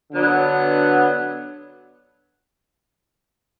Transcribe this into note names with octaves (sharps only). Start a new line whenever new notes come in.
D3 F#3 B3 D4